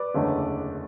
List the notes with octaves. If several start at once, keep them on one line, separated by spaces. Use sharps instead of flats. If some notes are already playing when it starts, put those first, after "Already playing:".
Already playing: B4 D5
F#1 E2 D3 A3 C#4